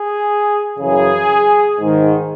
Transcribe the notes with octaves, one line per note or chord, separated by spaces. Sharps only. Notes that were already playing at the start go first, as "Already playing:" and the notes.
Already playing: G#4
F#2 C#3 E3 G#4
G#2 D#3